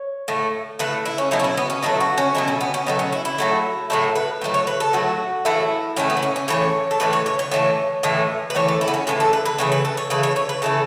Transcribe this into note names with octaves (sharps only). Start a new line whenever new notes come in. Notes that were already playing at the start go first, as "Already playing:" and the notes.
Already playing: C#5
A2 A3
A2 A3 B4
E4
C#4
B2 F#3 A3 E4
C#4
E4
B3
C#4
B2 F#3 A3 E4
F#4
C#4
B2 F#3 A3 E4
C#4
B3
C#4
B2 F#3 A3
C#4
E4
E4
A2 F#3 A3
A2 F#3 A3 E4
B4
A2 F#3 A3
C#5
B4
A4
A2 F#3 A3 F#4
A2 E3 A3 E4
A2 E3 A3 C#4
B3
E4
C#4
C#4
A2 E3 A3 C#5
A4
A2 E3 A3 B4
C#5
C#5
C#5
A2 E3 A3
A2 E3 A3
B4
A2 E3 A3 C#5
A4
E4
B3
C#4
A2 E3 A3 C#4
A4
B4
B4
C#3 E3 A3 C#5
B4
A4
C#5
C#3 E3 A3 B4
C#5
C#5
B4
C#3 E3 A3 A4